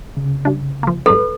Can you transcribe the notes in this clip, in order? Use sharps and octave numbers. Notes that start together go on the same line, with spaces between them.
C#3
G2 D4
F3 A#3
G#2 F#3 G3 A4 B4